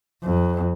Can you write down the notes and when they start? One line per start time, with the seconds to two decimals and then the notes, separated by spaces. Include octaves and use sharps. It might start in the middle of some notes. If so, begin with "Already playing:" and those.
0.23 F2